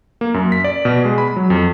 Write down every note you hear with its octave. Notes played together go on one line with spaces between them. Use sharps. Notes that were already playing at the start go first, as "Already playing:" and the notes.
A#3
F#2
B6
D5
B2
G#3
B5
F#3
F2